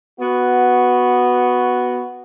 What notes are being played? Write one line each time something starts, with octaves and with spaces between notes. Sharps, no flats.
B3 F#4